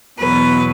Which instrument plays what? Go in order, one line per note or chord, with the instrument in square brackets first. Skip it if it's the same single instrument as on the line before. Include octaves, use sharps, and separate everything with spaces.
[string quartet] E2 B2 F#3 B4